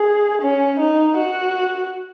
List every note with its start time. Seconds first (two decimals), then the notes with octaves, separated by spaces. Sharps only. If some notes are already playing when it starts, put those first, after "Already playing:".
Already playing: G#4
0.42 C#4
0.80 D#4
1.17 F#4